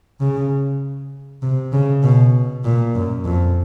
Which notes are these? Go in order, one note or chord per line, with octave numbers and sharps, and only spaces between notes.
C#3
C3
C#3
B2
A#2
F#2
F2